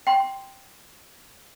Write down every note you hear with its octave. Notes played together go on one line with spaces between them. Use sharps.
G5 C6